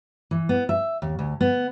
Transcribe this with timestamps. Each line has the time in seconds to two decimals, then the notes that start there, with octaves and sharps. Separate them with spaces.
0.31 E3
0.49 B3
0.69 E5
1.02 D#2
1.19 D2
1.41 B3